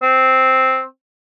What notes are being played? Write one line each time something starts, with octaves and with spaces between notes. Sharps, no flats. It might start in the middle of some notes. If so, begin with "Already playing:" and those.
C4